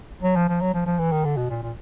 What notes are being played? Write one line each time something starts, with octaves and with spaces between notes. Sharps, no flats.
F#3
F3
F3
F#3
F3
F3
E3
D#3
D3
B2
A#2
A#2